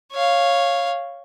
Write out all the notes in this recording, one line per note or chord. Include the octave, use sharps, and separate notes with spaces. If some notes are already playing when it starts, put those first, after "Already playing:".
C#5 F5